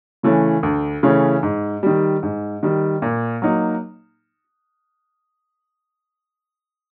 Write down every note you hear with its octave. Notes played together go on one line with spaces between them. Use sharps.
C#3 E3 A3 C#4
D2
C#3 E3 A3 C#4
G#2
D#3 G3
G#2
D#3 G3
A#2
F#3 A#3 D#4